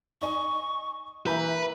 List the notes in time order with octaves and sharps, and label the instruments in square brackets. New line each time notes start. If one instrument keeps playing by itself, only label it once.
[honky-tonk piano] D#4 D#5 G#5 [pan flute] C#6
[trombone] E3 [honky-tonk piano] A#3 A#5 G6 [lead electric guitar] B4 [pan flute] E5